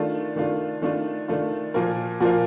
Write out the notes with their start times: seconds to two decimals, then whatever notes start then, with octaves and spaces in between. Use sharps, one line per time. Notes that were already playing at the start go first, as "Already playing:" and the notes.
Already playing: D#3 A3 D4 F4
0.36 D#3 A3 D4 F4
0.82 D#3 A3 D4 F4
1.28 D#3 A3 D4 F4
1.74 A#2 F3 A#3 F4 A#4
2.21 A#2 F3 A#3 F4 A#4